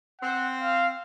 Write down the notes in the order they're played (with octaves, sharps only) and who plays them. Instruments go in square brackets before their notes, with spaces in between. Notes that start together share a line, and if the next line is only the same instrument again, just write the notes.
[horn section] C4 [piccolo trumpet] F#5
[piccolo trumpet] F5